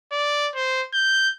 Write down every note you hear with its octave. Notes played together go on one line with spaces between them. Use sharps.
D5
C5
G6